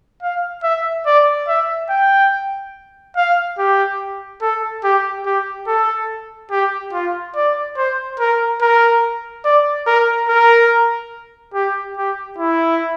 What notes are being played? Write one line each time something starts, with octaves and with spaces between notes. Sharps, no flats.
F5
E5
D5
E5
G5
F5
G4
A4
G4
G4
A4
G4
F4
D5
C5
A#4
A#4
D5
A#4
A#4
G4
G4
E4